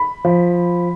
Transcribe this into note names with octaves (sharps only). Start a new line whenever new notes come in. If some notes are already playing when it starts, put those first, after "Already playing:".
Already playing: B5
F3